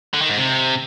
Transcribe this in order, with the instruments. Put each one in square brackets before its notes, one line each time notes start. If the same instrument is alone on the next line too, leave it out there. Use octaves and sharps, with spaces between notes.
[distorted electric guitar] D3
D#3
G#2
C3